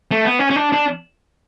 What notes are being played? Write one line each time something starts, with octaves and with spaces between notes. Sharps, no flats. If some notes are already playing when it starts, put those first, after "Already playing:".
A3
B3
C#4
C#4
D4
D4